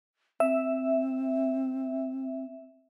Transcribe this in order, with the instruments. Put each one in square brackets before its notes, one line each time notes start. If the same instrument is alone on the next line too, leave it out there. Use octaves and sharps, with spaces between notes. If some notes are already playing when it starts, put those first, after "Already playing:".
[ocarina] C4 [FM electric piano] E5